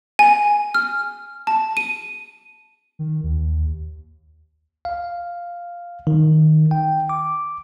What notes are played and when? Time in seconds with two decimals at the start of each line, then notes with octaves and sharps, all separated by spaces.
0.19 G#5
0.74 F6
1.47 A5
1.77 D#7
2.99 D#3
3.23 D#2
4.85 F5
6.07 D#3
6.71 G5
7.09 D6